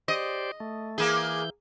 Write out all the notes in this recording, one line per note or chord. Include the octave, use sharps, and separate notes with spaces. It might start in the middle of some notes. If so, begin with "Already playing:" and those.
G4 C5 D5 D#5
A3
E3 A#3 G#4 G6